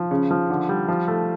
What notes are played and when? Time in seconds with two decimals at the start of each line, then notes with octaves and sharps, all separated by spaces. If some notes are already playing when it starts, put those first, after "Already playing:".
Already playing: F3
0.11 C#3
0.31 F3
0.50 D3
0.69 G3
0.88 F3
1.08 A3